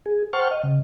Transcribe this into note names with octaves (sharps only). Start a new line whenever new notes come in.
G#4
C5 F#5 G5 A5 C#6 F6
D#5
C#3